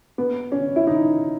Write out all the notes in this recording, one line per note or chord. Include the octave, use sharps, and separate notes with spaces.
B3
C#4
E4
D#4